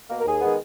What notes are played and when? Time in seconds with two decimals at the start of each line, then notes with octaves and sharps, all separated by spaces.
0.10 B2 A#3
0.19 A#4
0.25 D#2 G#4
0.42 D#3 G#3 B3